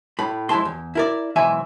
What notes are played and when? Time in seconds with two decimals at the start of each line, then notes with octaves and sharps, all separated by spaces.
0.19 A2 B5
0.49 F2 G#3 E4 A5 C6
0.65 E2
0.95 E4 A#4 D5
1.36 B1 G#2 E3 E5 G#5